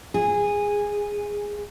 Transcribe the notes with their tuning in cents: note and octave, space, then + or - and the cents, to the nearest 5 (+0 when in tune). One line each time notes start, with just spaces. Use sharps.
G#4 -15